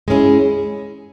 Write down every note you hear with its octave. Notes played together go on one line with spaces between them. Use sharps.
G#3 C#4 E4 G#4